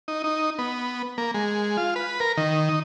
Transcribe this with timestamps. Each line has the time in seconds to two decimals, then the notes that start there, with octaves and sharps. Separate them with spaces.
0.08 D#4
0.24 D#4
0.58 B3
1.18 A#3
1.34 G#3
1.77 F4
1.96 B4
2.20 A#4
2.37 D#3
2.69 D#4